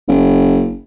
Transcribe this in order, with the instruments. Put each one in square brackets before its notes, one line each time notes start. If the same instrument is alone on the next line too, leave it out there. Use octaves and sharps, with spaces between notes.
[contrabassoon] F#1